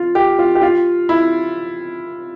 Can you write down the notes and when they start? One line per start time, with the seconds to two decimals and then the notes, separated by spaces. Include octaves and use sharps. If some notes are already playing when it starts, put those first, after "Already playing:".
Already playing: F4
0.15 G4
0.39 F4
0.55 G4
0.62 F4
1.09 E4